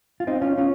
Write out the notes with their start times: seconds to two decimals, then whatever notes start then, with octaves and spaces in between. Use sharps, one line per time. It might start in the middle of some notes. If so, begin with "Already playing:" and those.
0.20 F4
0.27 C4 D#4
0.42 C#4 F4
0.58 C#4 F4